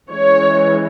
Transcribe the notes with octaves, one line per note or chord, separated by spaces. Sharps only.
E3 G#3 C#4 C#5